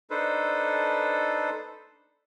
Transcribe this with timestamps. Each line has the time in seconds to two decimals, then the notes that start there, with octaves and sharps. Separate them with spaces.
0.10 D4 D#4 A4 B4 C5